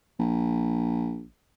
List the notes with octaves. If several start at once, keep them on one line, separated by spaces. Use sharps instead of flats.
A#1